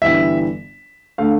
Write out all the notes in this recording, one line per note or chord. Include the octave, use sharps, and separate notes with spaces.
G1 G2 E3 G3 E5
D3 A3 F5